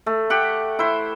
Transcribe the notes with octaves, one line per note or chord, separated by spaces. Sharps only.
A3
G4 F#5
E4 C5